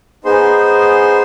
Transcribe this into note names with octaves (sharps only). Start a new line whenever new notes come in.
B3 D#4 G#4 C5 C6